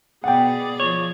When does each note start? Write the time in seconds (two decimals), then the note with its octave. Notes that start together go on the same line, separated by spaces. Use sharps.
0.24 B2 B3 G#4 D5 F#5 G5
0.80 F3 C#5